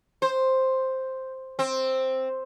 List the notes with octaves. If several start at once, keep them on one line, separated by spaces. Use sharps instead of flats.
C5
C4